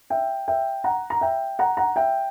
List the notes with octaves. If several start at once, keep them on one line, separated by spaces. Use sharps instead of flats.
E5 G5
E5 G5
F#5 A#5
A#5
E5 G5
F#5 A#5
F#5 A#5
E5 G5